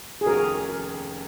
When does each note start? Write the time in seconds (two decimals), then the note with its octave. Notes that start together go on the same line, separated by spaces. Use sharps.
0.21 G#4
0.26 F1 D#2 D#3 A#3 C#4 F#4 A#4